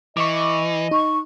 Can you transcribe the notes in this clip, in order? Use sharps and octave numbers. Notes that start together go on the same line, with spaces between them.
E3 D#5 C#6 D6
D#4 C#6